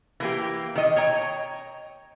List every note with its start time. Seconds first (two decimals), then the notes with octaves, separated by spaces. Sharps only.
0.20 E3 A#3 G4
0.75 D#3 D#5
0.96 C#5 G5 A#5